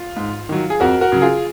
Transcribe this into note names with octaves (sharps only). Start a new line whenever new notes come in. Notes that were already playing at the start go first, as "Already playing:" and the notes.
Already playing: F4
G#2
D#3 F#3
G#4
F2 F#4 A#4
F#4 A#4
C#3 F#3
F4 G#4